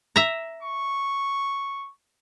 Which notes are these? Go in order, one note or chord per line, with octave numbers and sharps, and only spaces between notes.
E5 A#5
C#6